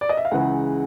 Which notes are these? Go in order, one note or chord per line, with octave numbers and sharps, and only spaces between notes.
D5
D#5
E5
F5
C#2 C#3 E3 F#5